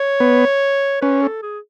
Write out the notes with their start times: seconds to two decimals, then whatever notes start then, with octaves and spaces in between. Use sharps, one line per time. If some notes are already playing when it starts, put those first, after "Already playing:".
Already playing: C#5
0.20 B3
1.01 C#4 B4
1.22 A4
1.43 G#4